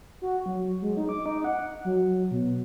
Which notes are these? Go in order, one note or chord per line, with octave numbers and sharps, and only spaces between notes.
F#4
F#3
G#3
D#4
D6
D#4
F#5
F#3
B2